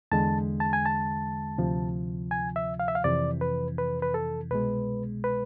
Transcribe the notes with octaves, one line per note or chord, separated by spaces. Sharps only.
E2 D3 G#3 A5
A5
G#5
A5
D2 C3 F3
G#5
E5
F5
E5
F5
F2 C3 E3 D5
B4
B4
B4
A4
C2 B2 G#3 B4
B4